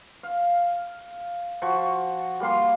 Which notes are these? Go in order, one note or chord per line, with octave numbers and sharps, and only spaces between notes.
F5
F3 F#4 C#6
G3 A#3 F5 C6